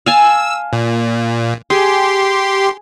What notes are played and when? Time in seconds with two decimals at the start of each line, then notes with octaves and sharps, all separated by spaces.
0.06 F5 G#5 A5 E6
0.73 A#2
1.70 G4 G#4 C6